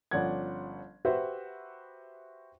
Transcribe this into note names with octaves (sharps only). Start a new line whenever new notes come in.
G1 F3 C#4 D5 F#5 G#6
F#4 G4 B4 C5 E5 F#5